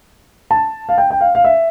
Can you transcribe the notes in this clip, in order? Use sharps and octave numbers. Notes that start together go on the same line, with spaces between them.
A5
F5
G5
G5
F5
F5
E5